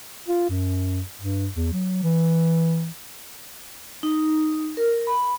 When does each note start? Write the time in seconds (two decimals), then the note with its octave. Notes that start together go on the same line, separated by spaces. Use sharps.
0.28 F4
0.49 F#2
1.21 G2
1.55 E2
1.73 F#3
2.03 E3
4.03 D#4
4.77 A#4
5.07 B5